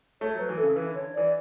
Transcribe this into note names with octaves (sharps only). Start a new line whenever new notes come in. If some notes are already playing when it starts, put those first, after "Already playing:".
A3 C#5
F#3 B4
E3
A4
C#3
E3 B4
D3 C#5
E3 D5